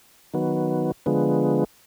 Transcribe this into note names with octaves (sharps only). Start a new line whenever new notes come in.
D#3 F#3 B3
D3 F3 G#3 B3